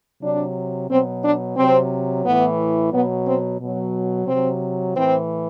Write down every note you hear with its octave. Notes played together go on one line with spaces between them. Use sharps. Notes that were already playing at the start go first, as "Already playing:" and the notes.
C3 F#3 D4
B2 F#3 C4
D4
C3 F#3 C4
A2 E3 B3
B2 F#3 B3
C4
B2 F#3
C3 F#3 C4
A2 E3 C4